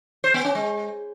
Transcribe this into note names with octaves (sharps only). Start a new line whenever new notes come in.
C5
B3
C#4
G#3